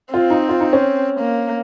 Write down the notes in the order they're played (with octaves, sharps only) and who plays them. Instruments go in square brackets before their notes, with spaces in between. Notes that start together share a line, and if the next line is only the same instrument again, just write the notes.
[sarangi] C4 [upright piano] F4
[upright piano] D#4
F4
D#4
C#4
[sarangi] A#3